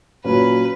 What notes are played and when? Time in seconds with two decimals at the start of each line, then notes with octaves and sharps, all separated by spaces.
0.24 A#2 F#3 C#4 B4